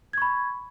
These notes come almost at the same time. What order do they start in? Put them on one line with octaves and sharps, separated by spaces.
G#6 C#6 B5